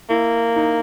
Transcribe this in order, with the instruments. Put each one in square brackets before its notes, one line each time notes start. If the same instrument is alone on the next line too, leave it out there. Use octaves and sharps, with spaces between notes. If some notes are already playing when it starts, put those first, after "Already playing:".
[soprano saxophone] A#3 [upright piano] E4
[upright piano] D#4